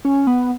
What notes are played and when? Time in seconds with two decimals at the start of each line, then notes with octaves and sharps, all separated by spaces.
0.05 C#4
0.27 B3